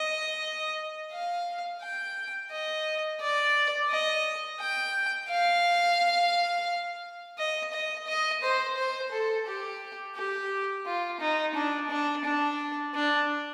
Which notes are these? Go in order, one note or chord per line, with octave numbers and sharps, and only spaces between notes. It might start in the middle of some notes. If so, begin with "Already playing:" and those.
Already playing: D#5
F5
G5
D#5
D5
D#5
G5
F5
D#5
D#5
D#5
C5
C5
A4
G4
G4
F4
D#4
D4
D4
D4
D4